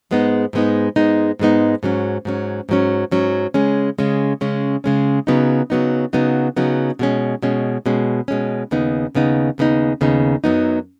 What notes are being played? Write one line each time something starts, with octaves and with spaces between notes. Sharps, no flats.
G#2 G#3 B3 D#4
G#2 G#3 B3 D#4
G#2 G#3 B3 D#4
G#2 G#3 B3 D#4
G#2 F#3 C#4
G#2 F#3 C#4
G#2 F#3 C#4
G#2 F#3 C#4
C#3 G#3 C#4
C#3 G#3 C#4
C#3 G#3 C#4
C#3 G#3 C#4
C#3 F#3 B3 D#4
C#3 F#3 B3 D#4
C#3 F#3 B3 D#4
C#3 F#3 B3 D#4
B2 G#3 C#4
B2 G#3 C#4
B2 G#3 C#4
B2 G#3 C#4
D#2 C#3 B3 D#4
D#2 C#3 B3 D#4
D#2 C#3 B3 D#4
D#2 C#3 B3 D#4
F#2 F#3 B3 D#4